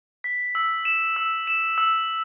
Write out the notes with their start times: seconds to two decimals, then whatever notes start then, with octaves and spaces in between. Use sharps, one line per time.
0.24 B6
0.55 E6
0.85 E7
1.16 E6
1.47 E7
1.78 E6